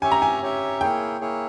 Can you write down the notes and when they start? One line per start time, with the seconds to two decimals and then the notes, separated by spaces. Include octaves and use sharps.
0.02 C#4 G4 C#5 E5 G#5
0.11 A#5
0.22 G#5
0.42 C#4 G4 C#5 E5
0.81 A#3 E4 G#4 C#5 G5
1.20 A#3 E4 G#4 C#5